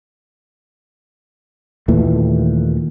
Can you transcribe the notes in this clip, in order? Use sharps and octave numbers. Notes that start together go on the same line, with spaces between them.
D#2 A#2 E3 A3